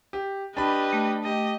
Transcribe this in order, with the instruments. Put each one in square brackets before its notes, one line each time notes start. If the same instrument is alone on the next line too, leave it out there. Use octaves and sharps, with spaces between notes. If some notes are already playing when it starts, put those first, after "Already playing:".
[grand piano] G4
[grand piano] D4 B5 [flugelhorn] G4 [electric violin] B4 D#5
[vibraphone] A3
[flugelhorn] G4 [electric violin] D#5